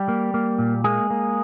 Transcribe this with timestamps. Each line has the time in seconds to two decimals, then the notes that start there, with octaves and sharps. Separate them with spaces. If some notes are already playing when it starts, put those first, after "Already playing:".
Already playing: G3 G4
0.08 A#3
0.34 A#3
0.59 A#2
0.84 G#3 A#3 G#4
1.10 A#3